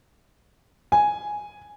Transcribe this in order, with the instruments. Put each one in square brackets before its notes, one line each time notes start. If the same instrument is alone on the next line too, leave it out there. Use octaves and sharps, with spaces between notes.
[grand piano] G#5